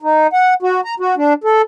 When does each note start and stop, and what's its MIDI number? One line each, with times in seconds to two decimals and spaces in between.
0.02 0.27 63
0.33 0.54 78
0.62 0.81 66
0.85 0.94 82
1.00 1.15 66
1.17 1.33 62
1.44 1.62 69